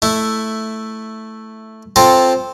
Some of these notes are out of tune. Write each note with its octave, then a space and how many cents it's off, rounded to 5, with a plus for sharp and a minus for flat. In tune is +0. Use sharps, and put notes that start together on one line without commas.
A3 +0 E4 +0
C4 +0 F4 +0 A4 -5